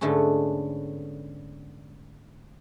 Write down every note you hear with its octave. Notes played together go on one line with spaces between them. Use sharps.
G#2 D3 A3 B3 C#4